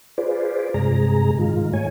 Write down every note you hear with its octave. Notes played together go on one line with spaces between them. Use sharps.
F4 G#4 B4 C5 D5
G2 C3 G#3 G#4 A#5
G#2 D#3 G#3 F4
G#2 A3 C#5 G#5